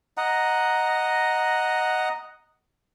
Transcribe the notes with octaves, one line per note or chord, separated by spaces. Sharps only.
D#5 F#5 A#5